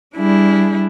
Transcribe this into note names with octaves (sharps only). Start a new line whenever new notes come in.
G3 D4 E4 G#4